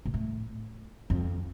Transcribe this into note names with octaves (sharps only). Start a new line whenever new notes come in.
A#2
A2
F2